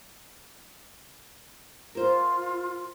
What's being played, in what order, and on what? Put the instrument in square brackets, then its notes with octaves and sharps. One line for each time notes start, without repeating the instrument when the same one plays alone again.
[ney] F4 [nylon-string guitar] A#4 C5